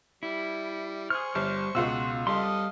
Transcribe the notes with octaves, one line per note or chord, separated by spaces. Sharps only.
G3 E4
G#4 C5 C#6 F6
G1 G3 F6
C#2 B2 F4 F#4 E6
G3 A4 D#5 F5 C6
D#6